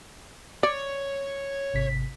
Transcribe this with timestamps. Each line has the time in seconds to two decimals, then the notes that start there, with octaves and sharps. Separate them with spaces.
0.63 C#5 D5
1.74 G#1 C3 B6